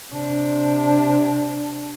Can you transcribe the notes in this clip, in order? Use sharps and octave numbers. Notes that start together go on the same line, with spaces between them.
C3 D4